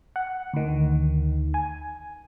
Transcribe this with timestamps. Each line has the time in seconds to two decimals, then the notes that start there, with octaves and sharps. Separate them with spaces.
0.16 F#5
0.53 D2 D#3
1.54 G#5